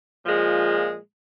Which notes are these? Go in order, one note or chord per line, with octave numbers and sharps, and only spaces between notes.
A#2 F3 G#3